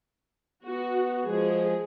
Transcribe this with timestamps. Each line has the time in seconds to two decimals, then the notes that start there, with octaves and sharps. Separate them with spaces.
0.64 B3 F#4
1.25 F3 G#3 G#4